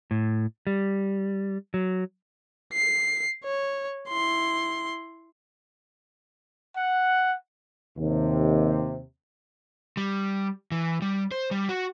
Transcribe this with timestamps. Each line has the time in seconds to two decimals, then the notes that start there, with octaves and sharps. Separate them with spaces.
0.11 A2
0.67 G3
1.74 F#3
2.73 C7
3.44 C#5
4.09 E4 C6
6.76 F#5
7.98 D#2 C3
9.97 G3
10.72 E3
11.02 G3
11.32 C5
11.51 G3
11.69 F#4